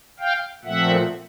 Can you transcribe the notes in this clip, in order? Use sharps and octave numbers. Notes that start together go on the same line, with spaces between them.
F5 G5
A#2 F3 A3 C4 E5 F#5